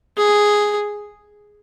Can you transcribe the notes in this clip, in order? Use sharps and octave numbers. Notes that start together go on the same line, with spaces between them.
G#4